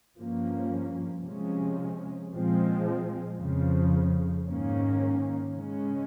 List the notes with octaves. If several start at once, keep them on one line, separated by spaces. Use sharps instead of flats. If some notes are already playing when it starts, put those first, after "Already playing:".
G2 F3 A#3 C#4
C3 F3 G#3 C#4
A#2 F3 G#3 C4
F2 C#3 F3
G#2 D#3 A#3 C#4
C#3 G#3 C#4